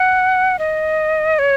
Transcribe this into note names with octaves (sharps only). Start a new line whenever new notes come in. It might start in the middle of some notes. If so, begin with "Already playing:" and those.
Already playing: F#5
D#5
C#5